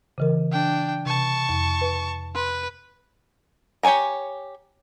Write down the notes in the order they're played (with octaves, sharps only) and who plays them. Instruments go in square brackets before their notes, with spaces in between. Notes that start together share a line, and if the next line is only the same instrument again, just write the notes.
[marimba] C#3 E3 A#4
[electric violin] D4 G5
[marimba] C3 [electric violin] A5 C#6
[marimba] F2
B4
[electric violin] B4 [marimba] C6
[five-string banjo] G4 C#5 D5 G#5 A#5